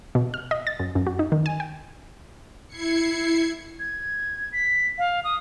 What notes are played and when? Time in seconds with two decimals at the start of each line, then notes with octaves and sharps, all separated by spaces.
0.15 B2
0.34 F6
0.51 D#5
0.67 A6
0.79 F#2
0.95 F#2
1.07 F#4
1.19 D#4
1.32 D#3
1.46 G#5
1.60 G5
2.68 E4 G#6 C7 C#7
3.80 G#6
4.53 B6
4.98 F5
5.24 D#6